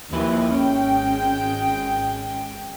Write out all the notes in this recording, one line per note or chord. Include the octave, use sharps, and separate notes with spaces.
D#2 F3 E4 B4
G#1 G#3 C#4 G5